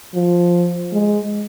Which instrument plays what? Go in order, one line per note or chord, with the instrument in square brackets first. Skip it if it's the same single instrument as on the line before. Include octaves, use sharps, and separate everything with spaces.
[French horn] F3
G#3